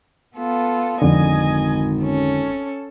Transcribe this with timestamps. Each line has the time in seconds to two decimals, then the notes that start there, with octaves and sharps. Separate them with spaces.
0.37 B3 F4 A4
1.02 G#1 F2 D3 D#5 G#5
2.02 C#4 A4